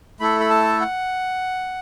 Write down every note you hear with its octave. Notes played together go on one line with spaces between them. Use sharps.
A3 E4 A4 B5
B5
A5
F#5